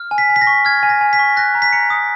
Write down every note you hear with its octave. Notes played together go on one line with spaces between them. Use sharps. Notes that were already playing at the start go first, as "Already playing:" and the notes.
Already playing: F6
G#5
B6
G#5
B6
A#6
C#6
F6 G#6
G#5
A#6
G#5
B6
C#6
F#6 A#6
A#5
B6
A#5 C#7
D#6